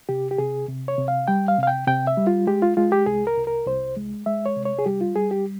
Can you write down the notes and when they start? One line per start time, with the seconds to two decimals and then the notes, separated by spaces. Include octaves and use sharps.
0.09 C3 G4
0.31 G4
0.38 C3 G#4
0.68 C3
0.88 C#5
0.98 C3
1.08 F5
1.28 G3 G5
1.48 F5
1.58 C3
1.63 F5
1.67 G5
1.87 C3 G5
2.07 E5
2.17 G3
2.27 F4
2.47 G#3 G4
2.62 F4
2.77 G#3 F4
2.92 G4
3.06 C2 G#4
3.27 A#4
3.37 C2
3.47 A#4
3.67 C2 C5
3.97 G#3
4.26 G#3 E5
4.46 C#5
4.56 C3
4.65 C#5
4.79 G#4
4.86 G3 G4
5.01 F4
5.16 G3 G#4
5.31 G4